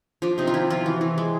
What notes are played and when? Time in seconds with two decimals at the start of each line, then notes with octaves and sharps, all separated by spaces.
0.22 F3 D4
0.38 C3 D#4
0.47 F4
0.54 F3 E4
0.70 F3 F4
0.86 E3 F#4
1.01 E3
1.18 G#3